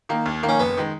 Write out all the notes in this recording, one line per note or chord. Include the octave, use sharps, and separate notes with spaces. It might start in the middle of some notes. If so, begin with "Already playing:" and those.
D#3 A#3
D#2
D#3 A#3
C#4
F#1 B3
D#3 G#3